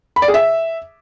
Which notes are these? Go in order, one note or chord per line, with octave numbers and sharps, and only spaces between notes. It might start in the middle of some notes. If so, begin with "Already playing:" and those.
B5
D5
G#4
E5